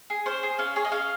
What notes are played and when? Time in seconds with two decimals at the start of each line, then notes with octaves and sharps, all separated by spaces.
0.10 G#4
0.26 C#4 C5
0.43 G#4
0.58 C#4 F5
0.76 G#4 C#5
0.85 D#5
0.92 C#4 F5